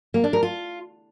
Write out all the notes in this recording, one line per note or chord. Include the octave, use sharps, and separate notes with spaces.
A#3
D4
A#4
F4